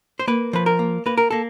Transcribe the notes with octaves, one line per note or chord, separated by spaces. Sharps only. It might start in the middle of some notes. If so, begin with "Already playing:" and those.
C5
A#3 B4
F3 B4
A#4
A#3
A#3 B4
A#4
A#3 A4